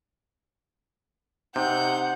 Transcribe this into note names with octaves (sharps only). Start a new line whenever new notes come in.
C3 D#4 F#5 G6